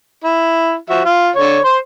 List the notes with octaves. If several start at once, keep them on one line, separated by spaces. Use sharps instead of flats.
E4
F3 F#4 E5
F4
D3 C#5
C5 C6